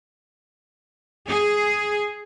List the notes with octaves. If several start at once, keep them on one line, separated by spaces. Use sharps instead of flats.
G#4